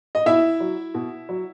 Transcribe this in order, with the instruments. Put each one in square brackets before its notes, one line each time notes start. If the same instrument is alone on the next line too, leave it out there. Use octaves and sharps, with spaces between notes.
[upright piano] D#5
B2 E4 E5
F#3
B2
F#3